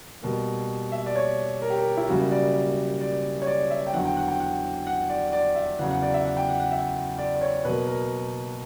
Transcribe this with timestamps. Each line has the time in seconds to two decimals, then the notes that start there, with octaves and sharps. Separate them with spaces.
0.22 B2 G3 A#3
0.92 E5
1.06 D5
1.16 C#5
1.62 A#4
1.70 G4
1.78 A#4
1.97 E4
2.08 F#2 C#3 G3 A#3 F#4
2.31 D5
3.01 D5
3.42 C#5
3.47 D5
3.70 E5
3.87 G5
3.94 E2 D3 F#3 F#5
4.05 G5
4.17 F#5
4.28 G5
4.40 F#5
4.87 F#5
5.09 D5
5.33 D5
5.56 E5
5.79 E2 C#3 F#3 F#5
5.91 F#5
6.02 D5
6.14 E5
6.25 F#5
6.37 G5
6.49 F#5
6.60 F#5
6.72 E5
7.18 D5
7.35 D5
7.41 C#5
7.64 B2 F#3 A#3 B4
7.87 A#4